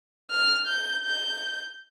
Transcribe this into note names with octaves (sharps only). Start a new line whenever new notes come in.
F6
G6
G6